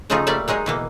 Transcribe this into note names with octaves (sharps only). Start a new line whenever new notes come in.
C#3 F3 A3 D#4 F4 G#4
G3 A3 A#3 D5 E5
F#3 G#3 D#4 G#4
B2 E3 A#3